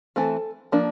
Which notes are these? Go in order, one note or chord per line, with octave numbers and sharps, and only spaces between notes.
E3 A3 C4 A4
F3 A#3 D4